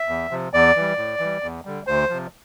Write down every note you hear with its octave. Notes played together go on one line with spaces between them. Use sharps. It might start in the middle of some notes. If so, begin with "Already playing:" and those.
Already playing: E5
E2
C3 F3
E2 D5
E3 G3
A2
E3 G3
E2
D3 G3
D2 C5
C3 F3